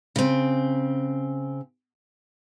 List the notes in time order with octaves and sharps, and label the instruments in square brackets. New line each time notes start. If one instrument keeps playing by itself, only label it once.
[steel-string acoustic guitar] C#3 C4